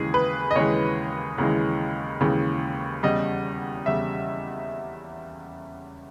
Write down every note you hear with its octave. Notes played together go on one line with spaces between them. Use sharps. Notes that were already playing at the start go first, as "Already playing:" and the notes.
Already playing: D#2 C#3 E3 G#3 G#4
B4
D#5
D#2 C#3 E3 G#3 C#5
D#2 C#3 E3 G#3
D#2 C#3 E3 G#3
E2 C#3 G3 D#5
E2 C#3 G3 E5